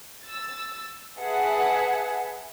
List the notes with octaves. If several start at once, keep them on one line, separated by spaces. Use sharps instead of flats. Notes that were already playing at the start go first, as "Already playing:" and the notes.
E6 A6
G#4 B4 E5 F#5 A5